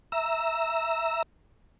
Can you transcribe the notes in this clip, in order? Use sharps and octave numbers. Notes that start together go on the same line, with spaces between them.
E5 A#5 E6